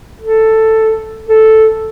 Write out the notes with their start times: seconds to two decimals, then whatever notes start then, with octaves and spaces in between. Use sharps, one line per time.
0.22 A4
1.29 A4